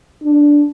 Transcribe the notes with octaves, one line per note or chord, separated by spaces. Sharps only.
D4